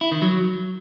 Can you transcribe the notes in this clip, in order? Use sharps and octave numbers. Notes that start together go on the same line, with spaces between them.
E4
D#3
F#3